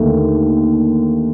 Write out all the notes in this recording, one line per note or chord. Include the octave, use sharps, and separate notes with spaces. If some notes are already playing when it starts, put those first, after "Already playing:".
Already playing: D#2 D3 A3